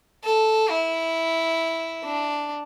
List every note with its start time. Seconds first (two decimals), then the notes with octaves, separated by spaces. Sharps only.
0.24 A4
0.70 E4
2.04 D4